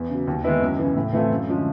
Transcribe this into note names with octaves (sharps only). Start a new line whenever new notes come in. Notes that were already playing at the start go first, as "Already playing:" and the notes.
Already playing: E2
C#3 F#3
D#2
D#3 G#3 B3 E4
F#2
C#3 E3
A2
E3 A3 C4 F4
F#2
D3 F3 G#3 C#4